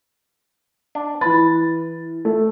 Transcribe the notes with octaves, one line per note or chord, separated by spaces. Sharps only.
D4
E3 B4 A6
A3